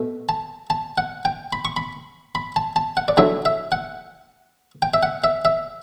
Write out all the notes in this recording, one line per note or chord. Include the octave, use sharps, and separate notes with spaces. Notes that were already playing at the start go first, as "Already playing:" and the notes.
Already playing: B2 A3
A5
A5
F#5
G5
B5
C#6
B5
B5
A5
A5
F#5
D5
D3 F#3 A3 E4 E5
E5
F#5
G5
E5
F#5
E5
E5